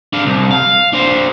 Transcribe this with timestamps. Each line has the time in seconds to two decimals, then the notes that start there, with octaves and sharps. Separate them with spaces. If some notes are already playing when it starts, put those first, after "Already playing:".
0.13 D4 F5
0.26 C2
0.51 F5
0.93 D4 C5